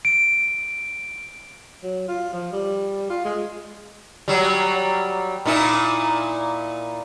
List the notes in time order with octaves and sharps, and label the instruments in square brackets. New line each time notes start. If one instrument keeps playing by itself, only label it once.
[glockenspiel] D7
[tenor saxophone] F#3
F4
F3
G3
F4
G#3
[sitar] F#3 G3
A#2 D#4 E4